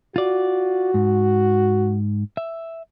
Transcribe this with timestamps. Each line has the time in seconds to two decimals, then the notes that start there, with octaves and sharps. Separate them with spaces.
0.16 F4 F#4 D5
0.94 G#2
2.37 E5